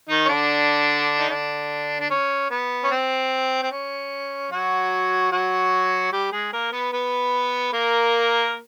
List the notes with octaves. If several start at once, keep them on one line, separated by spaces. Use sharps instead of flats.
D#3 D#4
C#4
D3 D4
D#4
D3 D4
D4
C#4
B3
C#4
C4
C4
C#4
F#3 F#4
F#3 F#4
G3 G4
G#3 G#4
A#3 A#4
B3 B4
B3 B4
A#3 A#4